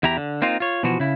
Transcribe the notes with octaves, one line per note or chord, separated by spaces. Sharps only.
E2 E4 G4 A#5
D3
A#3 C4 D#4 F4
F4 C#5
B2 E3 F3 F#4
C#3 E4